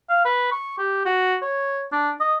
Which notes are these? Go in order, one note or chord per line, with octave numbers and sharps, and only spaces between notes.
F5
B4
C#6
G4
F#4
C#5
D4
D#5